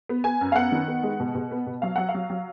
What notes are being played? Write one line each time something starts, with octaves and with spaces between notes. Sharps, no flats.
B3
B3 G#5
F#2
F5
B3 F#5
D#3
B3
G#3
B2
B2
B3
B2
F#3 F5
F#3 F#5
F5
F#3
F#3